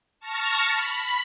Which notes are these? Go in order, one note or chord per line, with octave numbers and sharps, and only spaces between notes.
A5 C#6 F6 A#6
B5